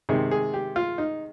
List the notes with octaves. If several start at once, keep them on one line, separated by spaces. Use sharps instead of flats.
C3 D#3 G#3 G#4
G#4
G4
F4
D#4